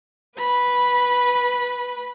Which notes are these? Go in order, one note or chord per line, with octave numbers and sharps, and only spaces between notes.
B4 B5